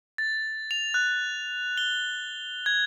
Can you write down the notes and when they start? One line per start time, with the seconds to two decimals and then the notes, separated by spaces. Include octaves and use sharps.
0.18 A6
0.71 F7
0.94 F#6
1.78 G7
2.66 G#6